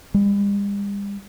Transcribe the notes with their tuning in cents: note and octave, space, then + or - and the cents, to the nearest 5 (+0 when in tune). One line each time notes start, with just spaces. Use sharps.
G3 +45